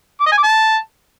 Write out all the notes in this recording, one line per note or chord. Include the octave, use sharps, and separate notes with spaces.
D6
D#5
G#5
D6
A5